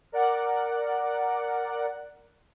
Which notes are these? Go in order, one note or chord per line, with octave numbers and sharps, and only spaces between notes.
A#4 D5 F#5